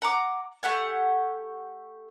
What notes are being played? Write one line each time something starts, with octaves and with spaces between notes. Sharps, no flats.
F#5 A#5 D6
A3 G4 F#5 G#5